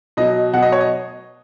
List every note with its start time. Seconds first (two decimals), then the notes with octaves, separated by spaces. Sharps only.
0.17 B2 F#3 D#5
0.53 B2 F#3 F#5
0.62 D#5
0.72 C#5
0.81 D#5